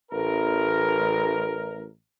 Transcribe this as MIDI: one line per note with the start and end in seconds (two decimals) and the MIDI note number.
0.12 1.87 33
0.12 1.87 70